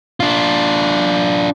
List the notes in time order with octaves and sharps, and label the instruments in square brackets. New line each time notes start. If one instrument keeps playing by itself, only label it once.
[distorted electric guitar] D4 F4